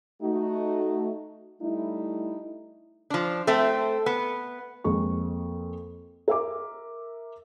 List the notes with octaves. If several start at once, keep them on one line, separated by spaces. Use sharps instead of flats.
A3 D#4 F#4
G3 A3 D#4 E4
F3 D4
A3 C4
B3
F2 G#3 A#3 C#6
A#4 E5 D6